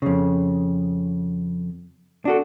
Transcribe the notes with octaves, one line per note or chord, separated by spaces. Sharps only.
F2 C#3
D4 F#4 A4